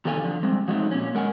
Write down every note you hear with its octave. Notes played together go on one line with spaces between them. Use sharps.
F2 C3 D#3 A4 F5 G#5
D3 F3
G3 G#3 C4
F3 F#3 G#3 A3 C4 D#4
A#2 C#4
G#3 A#4 F#5 G#5